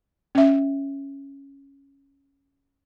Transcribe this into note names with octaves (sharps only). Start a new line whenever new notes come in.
C#4 E5